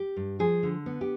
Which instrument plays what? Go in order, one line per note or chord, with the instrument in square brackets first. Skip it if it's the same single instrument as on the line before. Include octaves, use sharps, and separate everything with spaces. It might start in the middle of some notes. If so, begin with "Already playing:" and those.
Already playing: [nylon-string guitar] G4
G2
F3 G#4
D3
B3
G4